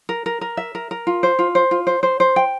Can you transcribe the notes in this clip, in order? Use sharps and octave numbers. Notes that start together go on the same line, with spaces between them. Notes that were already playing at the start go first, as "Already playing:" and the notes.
A#4
A#4
A#4
E5
A#4
A#4
F4
C5
F4
C5
F4
C5
C5
C5
G5